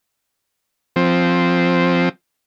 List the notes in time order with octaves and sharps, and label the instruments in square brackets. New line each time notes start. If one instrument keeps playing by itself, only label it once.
[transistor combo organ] F3 C4